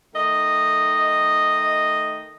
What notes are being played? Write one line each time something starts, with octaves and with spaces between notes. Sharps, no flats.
D#3 A3 D#5